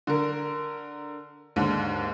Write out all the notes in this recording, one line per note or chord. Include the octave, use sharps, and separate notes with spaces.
D3 A#4
D#2 G#2 D3